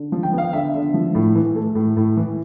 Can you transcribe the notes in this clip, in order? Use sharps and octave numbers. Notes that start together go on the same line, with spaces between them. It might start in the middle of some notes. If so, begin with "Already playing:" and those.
Already playing: D3
F3
G5
B3
F5
D3 E5
D3
F3
A2
E3
A3
A2
A2
E3